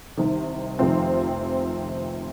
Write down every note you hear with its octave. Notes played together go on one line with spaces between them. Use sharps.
C2 C3 D#3
F1 F2 C3 D#3 C4 F4